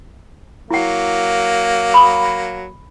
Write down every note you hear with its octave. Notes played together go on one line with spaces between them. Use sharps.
F#3 A#3 E4 F#5
B5 D#6